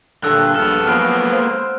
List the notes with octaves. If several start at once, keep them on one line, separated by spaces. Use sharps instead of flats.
G2 A#2 D3 A4 E6 F#6
A#1 G2 B3 A4 F6
F3 F#3 G#3 A#3 B3 F6 D7 E7
C5